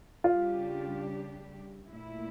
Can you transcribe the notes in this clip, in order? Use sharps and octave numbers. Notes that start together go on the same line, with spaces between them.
C#3 G3 D4 F4 G4
A#2 A3 E4